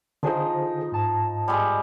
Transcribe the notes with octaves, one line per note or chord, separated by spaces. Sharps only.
D3 F3 D#4 G#4 C5
G#2 A5
G3 G#3